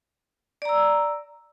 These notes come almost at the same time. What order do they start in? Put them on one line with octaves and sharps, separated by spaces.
D5 A#5 E6